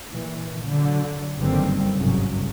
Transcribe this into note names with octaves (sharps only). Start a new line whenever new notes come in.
A#2 E3
D3 F#3
F#1 G2 D3 D#3 G3 C4
G1 C2 G#2 C#3 F#3